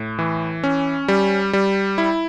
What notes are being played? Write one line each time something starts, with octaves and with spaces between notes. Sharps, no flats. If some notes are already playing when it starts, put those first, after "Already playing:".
Already playing: A2
E3
C#4
G3
G3
E4